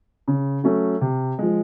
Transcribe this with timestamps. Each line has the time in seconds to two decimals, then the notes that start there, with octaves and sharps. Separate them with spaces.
0.28 C#3
0.64 F#3 A3 C#4
1.01 C3
1.39 F3 G#3